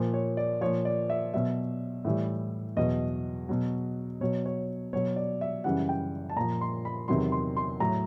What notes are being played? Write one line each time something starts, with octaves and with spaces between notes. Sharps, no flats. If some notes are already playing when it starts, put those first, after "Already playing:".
Already playing: A#2 F3 C5
C#5
D5
A#2 F3 C#5
D5
E5
B2 F#3 E5
A2 E3 G3
E2 B2 F#3 D#5
B2 F#3
B2 F#3 C#5
C#5
B2 F#3 C#5
D5
E5
F#2 C#3 E3 G3 F#5
G5
A5
A#2 F3 A#5
C6
B5
E2 C3 D#3 F#3 C6
C6
C6
A2 F#3 A#5